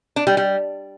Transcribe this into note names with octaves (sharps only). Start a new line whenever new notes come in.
D4
G3
G3